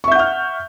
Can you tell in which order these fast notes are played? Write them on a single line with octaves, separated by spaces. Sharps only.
C#6 E5 G6 F#5 F6